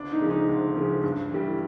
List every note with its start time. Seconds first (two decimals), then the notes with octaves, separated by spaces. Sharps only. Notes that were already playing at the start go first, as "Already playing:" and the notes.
Already playing: D2 D4
0.12 D#4
0.21 C#3 F3 G#3
0.30 D#4
0.49 D2
0.75 C#3 F3 G#3
1.03 G2
1.32 E3 G3